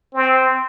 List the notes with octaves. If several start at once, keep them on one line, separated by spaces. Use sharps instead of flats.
C4